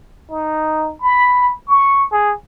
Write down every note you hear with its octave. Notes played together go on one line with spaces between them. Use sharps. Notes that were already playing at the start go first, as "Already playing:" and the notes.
D#4
B5
C#6
G#4